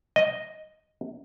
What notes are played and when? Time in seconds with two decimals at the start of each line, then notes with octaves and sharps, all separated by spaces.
0.16 D#5